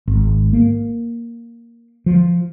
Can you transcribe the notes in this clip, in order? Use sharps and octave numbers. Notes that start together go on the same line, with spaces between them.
G#1
A#3
F3